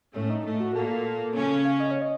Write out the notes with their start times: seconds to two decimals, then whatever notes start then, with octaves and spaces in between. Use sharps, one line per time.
0.15 A2 A3 C#4
0.30 D#4
0.45 A2 A3
0.60 F#4
0.75 A#2 A#3 A4
0.91 A4
1.35 C#3 C#4
1.65 F5
1.80 D#5
1.91 C#5
2.02 D#5